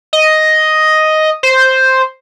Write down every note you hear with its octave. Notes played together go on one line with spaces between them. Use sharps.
D#5
C5